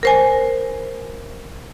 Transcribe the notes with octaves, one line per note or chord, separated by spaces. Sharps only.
A#4 C5 G#5